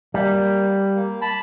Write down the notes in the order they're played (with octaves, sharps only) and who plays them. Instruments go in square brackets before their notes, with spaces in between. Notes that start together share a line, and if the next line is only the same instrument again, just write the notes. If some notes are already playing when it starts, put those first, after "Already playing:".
[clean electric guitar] G3 [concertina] A#3
[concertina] A#3
A5 B5